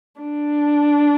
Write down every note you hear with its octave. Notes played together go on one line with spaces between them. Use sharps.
D4